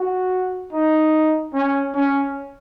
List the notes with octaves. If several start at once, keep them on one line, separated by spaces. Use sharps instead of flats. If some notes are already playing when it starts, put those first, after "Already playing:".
Already playing: F#4
D#4
C#4
C#4